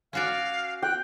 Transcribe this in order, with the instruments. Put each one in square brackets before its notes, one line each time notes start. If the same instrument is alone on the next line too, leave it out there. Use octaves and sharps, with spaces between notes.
[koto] C#4 F#4 D5 [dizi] F5
[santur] G5 [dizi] F#6